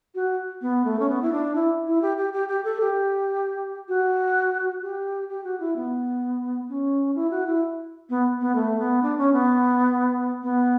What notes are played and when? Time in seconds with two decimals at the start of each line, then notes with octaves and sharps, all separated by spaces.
0.15 F#4
0.62 B3
0.85 A3
0.99 C#4
1.09 B3
1.22 E4
1.32 D4
1.55 E4
1.87 E4
2.02 G4
2.17 G4
2.33 G4
2.48 G4
2.64 A4
2.81 G4
3.88 F#4
4.82 G4
5.29 G4
5.44 F#4
5.60 E4
5.76 B3
6.69 C#4
7.15 E4
7.31 F#4
7.47 E4
8.10 B3
8.41 B3
8.55 A3
8.79 B3
9.03 D4
9.18 C#4
9.33 B3
10.43 B3